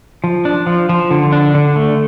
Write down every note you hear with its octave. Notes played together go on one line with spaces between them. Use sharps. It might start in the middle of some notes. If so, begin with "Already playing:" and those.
F3
D4
F3
F3
D3
D4
D3
A3